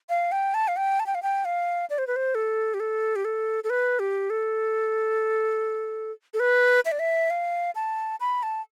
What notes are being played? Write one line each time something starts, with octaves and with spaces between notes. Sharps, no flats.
F5
G5
A5
F5
G5
A5
G5
F5
G5
F5
D5
C5
B4
C5
A4
G4
A4
G4
A4
A4
B4
G4
A4
A4
B4
E5
D5
E5
F5
A5
B5
A5